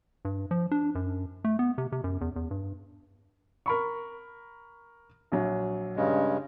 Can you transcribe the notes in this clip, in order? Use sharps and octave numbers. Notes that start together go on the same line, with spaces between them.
G2
F3
D4
F#2
A3
B3
C3
C3
F#2
E2
E2
G2
A#4 B5 C#6
A#1 F#3
G2 C#3 G#3